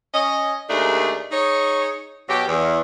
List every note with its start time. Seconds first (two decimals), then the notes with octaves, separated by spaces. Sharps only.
0.14 C#4 D#5
0.69 D#2 A3 D4 D#4 G#4
1.32 D#4 G#4 C#5
2.29 B2 F#3 G4
2.48 E2